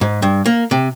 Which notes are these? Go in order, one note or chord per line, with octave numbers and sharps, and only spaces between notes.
G#2
G2
A#3
C3